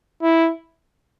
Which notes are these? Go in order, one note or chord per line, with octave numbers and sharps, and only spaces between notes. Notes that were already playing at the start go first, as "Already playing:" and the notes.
E4